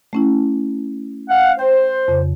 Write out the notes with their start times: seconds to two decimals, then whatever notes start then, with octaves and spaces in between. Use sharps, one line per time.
0.13 A3 C#4 E4
1.30 F5 F#5
1.59 C5 G5
2.08 F2 C#3